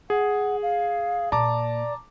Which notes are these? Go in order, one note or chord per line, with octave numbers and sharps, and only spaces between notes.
G#4 F#5
F5
A#2 D5 A5 A#5 D6